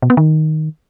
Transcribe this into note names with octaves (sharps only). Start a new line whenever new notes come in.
B2
B3
D#3